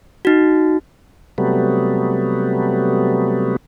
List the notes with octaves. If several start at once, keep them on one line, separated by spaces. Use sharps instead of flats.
D#4 F#4
C3 F#3 G3 A3 B3